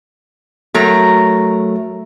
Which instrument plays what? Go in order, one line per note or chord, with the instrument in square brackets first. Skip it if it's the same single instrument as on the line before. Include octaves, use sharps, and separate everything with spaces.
[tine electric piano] F#3 A3 [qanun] A#4 A#5